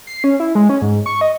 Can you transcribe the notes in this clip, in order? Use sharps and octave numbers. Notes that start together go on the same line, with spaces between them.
C7
C#4
E4
G#3
C#4
G#2
C#6
D#5